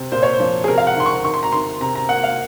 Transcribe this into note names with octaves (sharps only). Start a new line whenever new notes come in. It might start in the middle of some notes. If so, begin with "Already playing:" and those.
Already playing: C3
A#2 C5
C#5
C5
F3
G#4
C3 A#4
F5
F#5
D#3 C6
C#6
D#3 C#6
C6
A#5
D#3 C6
C3 A#5
A#5
A#3 F#5
F5